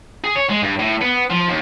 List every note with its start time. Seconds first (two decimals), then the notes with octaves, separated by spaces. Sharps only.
0.24 G#4
0.35 C#5
0.49 G#3
0.62 G2
0.79 A2
1.01 B3
1.30 F3
1.48 D#2